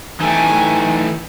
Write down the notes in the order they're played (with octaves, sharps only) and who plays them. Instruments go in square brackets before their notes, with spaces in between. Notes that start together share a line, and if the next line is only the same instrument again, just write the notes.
[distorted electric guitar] E3 A3 [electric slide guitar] D#4 A4 G5 [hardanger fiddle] G#5